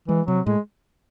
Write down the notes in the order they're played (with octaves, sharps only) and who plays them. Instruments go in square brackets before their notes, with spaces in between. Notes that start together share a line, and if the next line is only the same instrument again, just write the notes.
[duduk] E3 [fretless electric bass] G#3
[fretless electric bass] C3 [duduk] F#3
[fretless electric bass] A2 [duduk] G#3